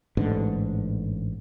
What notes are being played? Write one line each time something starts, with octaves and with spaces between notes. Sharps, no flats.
A1 G#2 D3